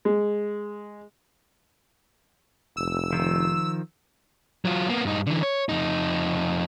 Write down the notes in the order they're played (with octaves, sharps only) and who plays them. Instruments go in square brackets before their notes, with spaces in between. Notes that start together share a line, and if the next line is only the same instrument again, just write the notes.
[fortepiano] G#3
[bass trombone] F1 [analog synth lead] E6
[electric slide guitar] D#3 F3
[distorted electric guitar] F#3 F4
A#3 B3
G2 D#4
D3 E3
C#5
F2 D#4